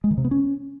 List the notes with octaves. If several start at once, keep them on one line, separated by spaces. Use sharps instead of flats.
G#3
D#3
C3
B3
C#4